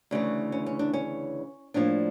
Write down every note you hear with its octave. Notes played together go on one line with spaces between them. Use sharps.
D2 C#3 E3
C#4
C#4
D4
C#4
A2 F3 A#3 D4